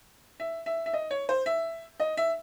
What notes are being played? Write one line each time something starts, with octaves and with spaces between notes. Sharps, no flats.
E5
E5
E5
D#5
C#5
C5
E5
D#5
E5